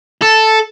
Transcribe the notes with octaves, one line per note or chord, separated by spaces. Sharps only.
A4